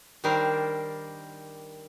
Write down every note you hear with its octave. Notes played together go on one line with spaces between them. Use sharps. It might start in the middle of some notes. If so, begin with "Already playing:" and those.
D#3 G3 D4 A#4 C5